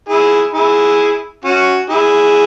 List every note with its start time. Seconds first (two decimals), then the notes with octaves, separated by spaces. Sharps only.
0.09 E4 G#4
0.54 E4 G#4
1.44 C#4 F#4
1.90 E4 G#4